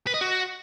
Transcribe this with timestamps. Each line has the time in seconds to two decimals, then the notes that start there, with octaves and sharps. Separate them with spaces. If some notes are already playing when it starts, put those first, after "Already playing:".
0.07 B4
0.14 D#5
0.21 F#4